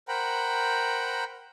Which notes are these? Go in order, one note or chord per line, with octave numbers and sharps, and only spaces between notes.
A#4 C5 F#5 G5 A#5 B5